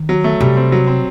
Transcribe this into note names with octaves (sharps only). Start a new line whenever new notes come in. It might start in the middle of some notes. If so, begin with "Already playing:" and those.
Already playing: D#3
F#3
A3
C3 G3
C4
F#3
C4